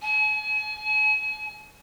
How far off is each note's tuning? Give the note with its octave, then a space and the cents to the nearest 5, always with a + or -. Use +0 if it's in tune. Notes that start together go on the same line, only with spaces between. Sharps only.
G#5 +40